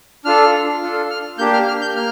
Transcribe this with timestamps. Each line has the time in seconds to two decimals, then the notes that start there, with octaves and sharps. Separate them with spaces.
0.25 D4 F4 A4 F6
0.81 D4 F4 A4
1.10 F6
1.39 A#3 D4 G4 G6
1.53 F6
1.68 F6
1.82 G6
1.96 A#3 F6